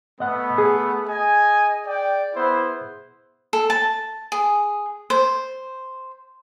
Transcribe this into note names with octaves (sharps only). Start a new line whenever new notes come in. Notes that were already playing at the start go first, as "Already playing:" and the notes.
A3 B3 D#5 F#5
G#4
D#5 G#5
D5 G5
B3 E4 C5
A4
A5
G#4
C5